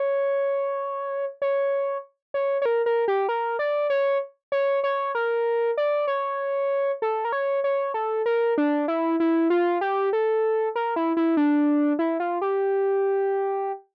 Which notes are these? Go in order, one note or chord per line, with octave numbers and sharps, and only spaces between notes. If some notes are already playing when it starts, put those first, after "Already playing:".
Already playing: C#5
C#5
C#5
C#5
A#4
A#4
G4
A#4
D5
C#5
C#5
C#5
A#4
D5
C#5
A4
A#4
C#5
C#5
A4
A#4
D4
E4
E4
F4
G4
A4
A#4
E4
E4
D4
E4
F4
G4